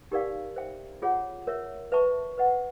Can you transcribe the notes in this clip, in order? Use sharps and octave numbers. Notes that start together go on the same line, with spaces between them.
D#4 G4 A#4 D5 F5
C5 E5 G5
F4 G#4 C#5 F#5
A#4 C#5 E5
B4 E5 A5 C#6
B4 D#5 F#5